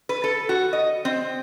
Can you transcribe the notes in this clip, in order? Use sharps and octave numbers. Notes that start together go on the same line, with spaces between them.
B4
A4
F#4
D#5
C4